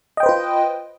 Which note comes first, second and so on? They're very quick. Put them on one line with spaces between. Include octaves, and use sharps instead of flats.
D#5 G5 C5 B4 F4